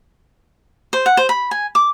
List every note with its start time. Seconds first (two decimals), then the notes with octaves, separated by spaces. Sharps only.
0.93 C5
1.06 F#5
1.17 C5
1.29 B5
1.51 G#5
1.75 D6